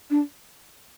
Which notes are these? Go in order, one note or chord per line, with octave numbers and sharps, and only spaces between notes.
D4